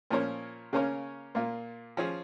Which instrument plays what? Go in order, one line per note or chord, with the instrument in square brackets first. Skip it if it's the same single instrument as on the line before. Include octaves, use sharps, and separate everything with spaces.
[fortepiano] A#2 F3 C#4 A#4 C#5
C#3 A#3 C#4 A#4 C#5
A#2 A#3 F4
F3 C#4 G#4